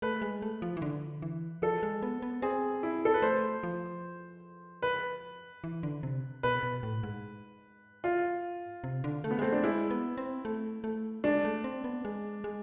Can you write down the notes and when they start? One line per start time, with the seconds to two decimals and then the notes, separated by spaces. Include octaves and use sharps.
0.02 A3 B4
0.22 G#3
0.42 A3
0.62 F3
0.77 E3
0.82 D3
1.22 E3
1.62 F3 A4
1.83 G#3
2.03 B3
2.22 B3
2.42 C4 G#4
2.83 E4
3.05 A4
3.14 B4
3.22 A3 C5
3.63 F3
4.82 B4
5.64 E3
5.83 D3
6.03 C3
6.43 B2 B4
6.63 B2
6.83 A2
7.03 G#2
8.04 F4
8.84 C3
9.04 D3
9.24 A3
9.31 B3
9.39 G#3
9.42 A3 C4
9.52 D4
9.63 G#3 E4
9.91 B3
10.18 C4
10.45 A3
10.84 A3
11.24 G#3 D4
11.45 A3
11.64 C4
11.84 B3
12.05 G#3
12.44 G#3